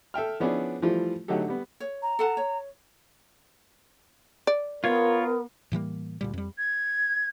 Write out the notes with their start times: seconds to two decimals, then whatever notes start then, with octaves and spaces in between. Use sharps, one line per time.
0.14 A4 E5 G5 F6
0.40 F3 B3 C#4 D4 E4 G#4
0.82 E3 F3 G3 A3 F4
1.28 D3 F#3 A3 D#4 G4 A4
1.48 G3 B3
1.80 C#5
2.02 A#5
2.19 A4 F#5 A5
2.37 C#5
4.47 D5
4.84 B3 F4 A#4 C#5
5.72 A2 E3 G3 A#3
6.21 D2 A#2 G3
6.33 F2 G3
6.58 G#6